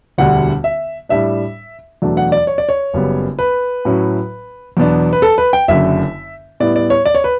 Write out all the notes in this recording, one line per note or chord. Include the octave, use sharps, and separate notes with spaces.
E1 D2 D3 G3 F#5
E5
A2 G3 D4 E5
E2 B2 F#3 A3 D4
F#5
D5
C#5
D5
C#5
F#1 F#2 C#3 G3 B3
B4
A2 F#3 C#4 E4
E2 B2 F#3 B3 D4
B4
A4
B4
G5
F#1 F#2 D3 E5
A2 G3 B3 E4 D5
D5
C#5
D5
C#5
B4